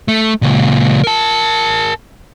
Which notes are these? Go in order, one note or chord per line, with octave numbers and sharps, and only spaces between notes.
A3
C#2 A#2
A#4 A5